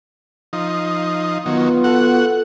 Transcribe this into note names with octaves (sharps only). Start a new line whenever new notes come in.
F3 D#4
D#3 F#3 B3 F4
F#4 A4 F#5